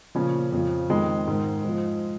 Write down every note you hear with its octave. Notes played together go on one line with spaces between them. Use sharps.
A#2 C#3 F3 C#4
F2
F3
F2 D#3 G#3
G#2 D#3
G#2 F3